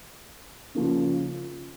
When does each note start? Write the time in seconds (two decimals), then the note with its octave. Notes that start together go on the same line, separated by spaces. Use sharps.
0.75 C#3 F3 A#3 C#4